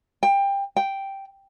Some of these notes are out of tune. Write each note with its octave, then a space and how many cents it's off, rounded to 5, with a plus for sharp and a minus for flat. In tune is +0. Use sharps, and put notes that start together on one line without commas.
G5 +20
G5 -5